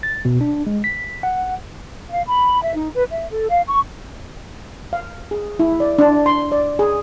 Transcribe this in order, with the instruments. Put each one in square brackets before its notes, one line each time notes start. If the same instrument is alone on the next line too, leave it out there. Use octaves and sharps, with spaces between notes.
[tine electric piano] A6
B2
D4
G#3
B6
F#5
[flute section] F5
B5
E5
D#4
B4
E5
A4
F5
C#6
[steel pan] F5
G#4
E4
D5
D4
C6
D5
G#4